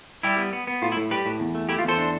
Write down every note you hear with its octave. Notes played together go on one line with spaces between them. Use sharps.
G3 E4 G4
B3
B3
B3
A2 F4
E4
A2
G3 G4 B4
A2
E2
A3
A3 E4 G4
F4
E2 A4 C5
D4